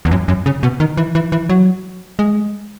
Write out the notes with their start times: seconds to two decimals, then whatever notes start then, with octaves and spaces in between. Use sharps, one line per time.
0.05 E2
0.11 F#2
0.28 F#2
0.46 C#3
0.63 B2
0.80 D#3
0.97 E3
1.15 E3
1.32 E3
1.49 F#3
2.19 G#3